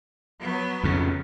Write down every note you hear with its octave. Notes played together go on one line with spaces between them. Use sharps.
F#3 B3
F2 C#3